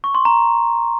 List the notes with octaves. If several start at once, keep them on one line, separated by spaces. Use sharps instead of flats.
C#6
C6
A#5